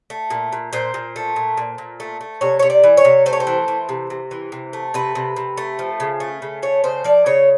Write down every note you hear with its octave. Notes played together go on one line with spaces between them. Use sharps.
A3
A#2
A#2
A#2 C5
A#2
A3
A#2
A#2
A#2
A3
A3
C3 C#5
C3 C#5
D5
E3
C#5
C3
A3 C5
C#5
C5
E3
E3
C3
C3
E3
C3
A3
C3 B4
C3
C3
A3
F3
C#3
A3
C#3
A3 C#5
C#3 C5
F3 D5
C#3 C#5